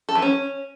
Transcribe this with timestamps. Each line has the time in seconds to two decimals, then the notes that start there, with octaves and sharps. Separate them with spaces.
0.09 A4
0.15 E3
0.22 C#4